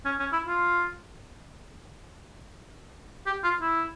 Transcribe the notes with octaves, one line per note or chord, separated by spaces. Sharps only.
C#4
C#4
E4
F4
G4
F4
E4